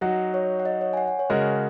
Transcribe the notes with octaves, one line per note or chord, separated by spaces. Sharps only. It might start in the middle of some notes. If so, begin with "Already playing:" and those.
F#3 D#4 F#4 F#5
C#5
F#5
D#5
C#5
G#5
F#5
C#5
C#3 G#3 F#4 A#4 D#5